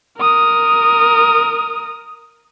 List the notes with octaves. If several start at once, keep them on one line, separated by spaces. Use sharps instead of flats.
A#4 D#6